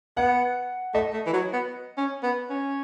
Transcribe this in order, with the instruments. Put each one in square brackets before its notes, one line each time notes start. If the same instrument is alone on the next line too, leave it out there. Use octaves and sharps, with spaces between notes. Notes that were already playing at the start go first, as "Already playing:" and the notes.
[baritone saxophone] B3 [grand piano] F#5
[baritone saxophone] A3 [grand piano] D#5
[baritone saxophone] A3
E3
F#3
B3
C#4
B3
C#4